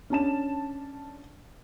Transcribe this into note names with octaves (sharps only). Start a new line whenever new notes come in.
C#4 D4 A5 E7